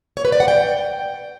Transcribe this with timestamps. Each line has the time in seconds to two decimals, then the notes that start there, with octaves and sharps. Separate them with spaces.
0.17 C#5
0.25 B4
0.32 D5
0.40 F#5
0.48 G5